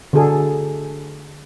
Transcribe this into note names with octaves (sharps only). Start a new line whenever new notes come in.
D3 D4 F#4 G#4 A4